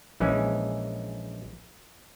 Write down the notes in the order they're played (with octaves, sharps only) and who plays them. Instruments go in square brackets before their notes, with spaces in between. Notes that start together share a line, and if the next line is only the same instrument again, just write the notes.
[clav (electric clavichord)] A#1 E3 G#3 C#4